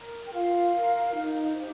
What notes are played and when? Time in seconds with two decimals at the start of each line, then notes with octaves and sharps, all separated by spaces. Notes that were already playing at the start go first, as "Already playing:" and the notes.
Already playing: A#4
0.27 G5
0.34 F4 F5
0.74 A#4
1.14 D#4
1.54 G4 C5